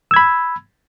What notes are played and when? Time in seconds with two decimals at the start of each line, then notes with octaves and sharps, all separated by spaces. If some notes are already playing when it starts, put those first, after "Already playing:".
0.11 E6
0.14 G#6
0.16 B5